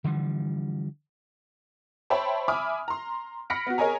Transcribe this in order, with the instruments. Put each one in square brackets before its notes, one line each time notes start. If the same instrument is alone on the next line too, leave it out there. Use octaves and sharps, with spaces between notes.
[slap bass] D3 E3 F3 G3
[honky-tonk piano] C5 C#5 E5 G5 A5 B5
E5 G#5 B5 D6 D#6 F6
A#5 C6
B5 F6 A#6 B6 C#7 D7
B3 F#4
G#4 A#4 C#5 D#5 G#5 A#5